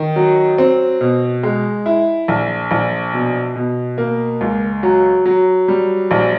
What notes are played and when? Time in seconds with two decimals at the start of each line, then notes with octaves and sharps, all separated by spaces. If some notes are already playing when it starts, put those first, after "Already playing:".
Already playing: D#3
0.16 F#3
0.58 C4
1.01 B2
1.43 G#3
1.86 E4
2.28 A#1
2.71 A#1
3.13 B2
3.56 B2
3.98 A#3
4.41 C#2
4.83 F#3
5.26 F#3
5.68 G3
6.11 A#1